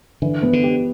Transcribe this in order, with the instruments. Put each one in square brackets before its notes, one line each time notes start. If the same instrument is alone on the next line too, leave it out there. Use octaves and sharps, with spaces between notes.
[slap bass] D3 [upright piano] E3
[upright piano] B3
[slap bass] D3
[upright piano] G4